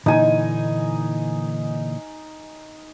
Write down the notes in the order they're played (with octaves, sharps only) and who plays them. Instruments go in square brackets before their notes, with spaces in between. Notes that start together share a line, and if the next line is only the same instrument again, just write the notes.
[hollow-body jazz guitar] A#2 D3 E3 [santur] D#4 G#5